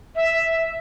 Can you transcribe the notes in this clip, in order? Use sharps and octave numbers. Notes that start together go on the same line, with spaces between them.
E5